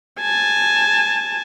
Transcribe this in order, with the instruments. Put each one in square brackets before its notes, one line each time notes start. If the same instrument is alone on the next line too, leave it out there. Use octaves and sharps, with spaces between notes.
[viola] G#5 A5